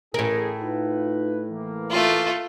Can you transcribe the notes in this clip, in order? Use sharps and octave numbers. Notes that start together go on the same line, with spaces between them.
A1 A2 E4 G#4 A#4
D#4 F4 B4
E3 A#3
A3 F4